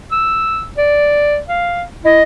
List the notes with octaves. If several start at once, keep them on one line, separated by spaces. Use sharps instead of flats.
E6
D5
F5
E4 D#5